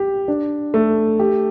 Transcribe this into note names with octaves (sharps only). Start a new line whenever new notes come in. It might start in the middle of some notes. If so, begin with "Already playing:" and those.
Already playing: G4
D4
A3
G4